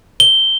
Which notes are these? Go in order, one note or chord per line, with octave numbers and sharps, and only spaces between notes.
G7